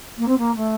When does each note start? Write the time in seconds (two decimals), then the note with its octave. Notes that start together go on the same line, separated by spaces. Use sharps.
0.17 A#3
0.28 C4
0.38 A#3
0.56 A3